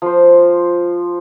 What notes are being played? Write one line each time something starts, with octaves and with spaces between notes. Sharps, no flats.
F3 C5